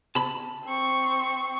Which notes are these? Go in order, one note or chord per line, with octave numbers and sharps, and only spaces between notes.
A5 B5
C4 C#6